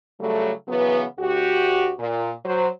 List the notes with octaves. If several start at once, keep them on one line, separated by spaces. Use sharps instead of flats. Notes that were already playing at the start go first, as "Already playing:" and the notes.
C#3 F#3 G3 A3
C#3 E3 F#3 B3
D2 F#4 G4
A#2
F#3 C5